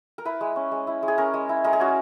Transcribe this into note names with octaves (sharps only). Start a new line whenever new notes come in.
A#4
E4 B4
G#3
C#4
G#3
E4
G#3
G#4
C#4 A#4
G#3
E4
G#3 A#4
G#4
C#4 F#4